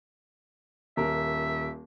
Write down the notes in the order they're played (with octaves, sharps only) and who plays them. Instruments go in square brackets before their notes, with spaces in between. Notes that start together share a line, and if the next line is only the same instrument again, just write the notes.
[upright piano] D#1 A#4 [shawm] E5